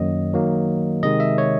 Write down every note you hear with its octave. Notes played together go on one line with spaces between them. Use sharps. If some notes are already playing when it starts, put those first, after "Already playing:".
Already playing: F#2 D#3 F#3 A#3 D#5
D#3 F#3 A#3
C3 D#3 G#3 D#5
E5
C#5